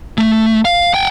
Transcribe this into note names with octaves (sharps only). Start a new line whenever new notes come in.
A3
F5
F#5 G5